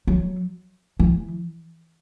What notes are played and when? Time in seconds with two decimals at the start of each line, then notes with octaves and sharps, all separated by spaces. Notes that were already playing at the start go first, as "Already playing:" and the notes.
0.07 F#3
0.99 E3